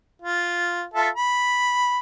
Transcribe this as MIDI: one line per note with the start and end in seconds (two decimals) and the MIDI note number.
0.22 0.84 65
0.94 1.09 65
0.94 1.09 69
0.94 1.09 76
1.16 2.00 83